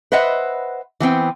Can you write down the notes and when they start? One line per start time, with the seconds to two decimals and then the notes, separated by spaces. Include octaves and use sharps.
0.12 B4 C5 D#5 E5 F#5
1.00 E3 B3 C4 G5